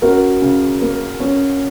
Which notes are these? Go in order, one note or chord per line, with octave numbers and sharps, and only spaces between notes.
C#4 F#4 A#4
C#3
A#3
C#4